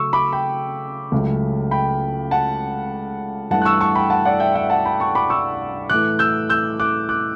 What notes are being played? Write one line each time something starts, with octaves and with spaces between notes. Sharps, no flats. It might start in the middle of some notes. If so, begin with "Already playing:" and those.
Already playing: C#3 F#3 A3 C#6 E6
B5 D6
G5 B5
C#2 C#3 F#3 A3
G5 B5
F#5 A5
G2 E3 A3 F#5 A5
F#6
C#6 E6
A5 C#6
G5 B5
F#5 A5
D5 F#5
E5 G5
E5 G5
F#5 A5
G5 B5
A5 C#6
B5 D6
C#6 E6
A2 E3 A3 D6 F#6
E6 G6
E6 G6
D6 F#6
D6 F#6